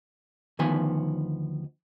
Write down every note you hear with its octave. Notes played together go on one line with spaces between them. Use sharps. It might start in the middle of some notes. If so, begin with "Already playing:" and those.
D2 D#3 F3 B3 G#5